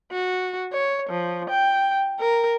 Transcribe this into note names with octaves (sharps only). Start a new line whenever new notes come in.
F#4
C#5
F3
G5
A#4